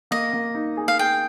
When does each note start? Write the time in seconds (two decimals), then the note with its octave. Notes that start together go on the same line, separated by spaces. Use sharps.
0.11 A#3 D#5
0.33 A#3
0.55 D#4
0.77 G#4
0.88 F5
0.99 G#4 G5